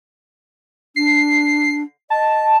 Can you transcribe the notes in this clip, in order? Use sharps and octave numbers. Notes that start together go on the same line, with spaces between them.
D4 C7
D#5 A5